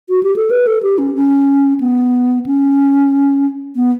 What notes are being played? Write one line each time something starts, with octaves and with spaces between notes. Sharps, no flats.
F#4
G4
A4
B4
A4
G4
C#4
C#4
B3
C#4
B3